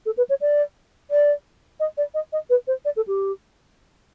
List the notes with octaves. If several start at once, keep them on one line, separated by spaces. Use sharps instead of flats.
A4
B4
C#5
D5
D5
D#5
D5
D#5
D#5
B4
C5
D5
A4
G4